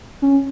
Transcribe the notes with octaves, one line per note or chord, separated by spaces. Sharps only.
C#4